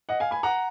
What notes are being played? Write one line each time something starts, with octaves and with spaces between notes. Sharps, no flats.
D#5 F#5
F5 G#5
G#5 B5
F#5 A#5